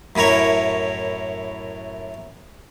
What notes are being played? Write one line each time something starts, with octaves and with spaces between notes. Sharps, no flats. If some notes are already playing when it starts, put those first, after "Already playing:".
F#2 A2 E4 A#4 C#5